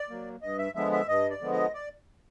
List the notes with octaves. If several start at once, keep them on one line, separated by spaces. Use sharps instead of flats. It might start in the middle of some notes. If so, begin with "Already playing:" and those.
Already playing: D5
F#3 A#3
G2 D#5
E5
D3 F3 G#3 B3 E5
E5
G2 D#5
D5
D3 F3 G#3 B3
D#5
D5